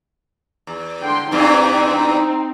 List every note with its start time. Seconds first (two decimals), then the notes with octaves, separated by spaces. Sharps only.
0.67 E2
1.02 D3 G5 C6
1.31 E2 G2 E3 C4 D#4